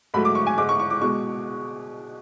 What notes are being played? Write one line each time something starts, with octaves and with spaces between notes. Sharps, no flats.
G#2 F#3 A3 B5
D6
C#6
G#5
G#2 G#3 D6
C#6
C#6
D6
B2 G#3 C#6